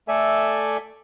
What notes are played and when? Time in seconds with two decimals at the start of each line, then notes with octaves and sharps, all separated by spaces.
0.08 A3 A4 D5 E5 G#5